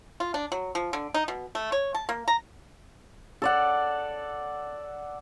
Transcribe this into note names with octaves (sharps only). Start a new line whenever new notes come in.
F4
D4
F#3
F3
D3
D#4
B2
A3
C#5
A5
A#3
A#5
A4 D5 F#5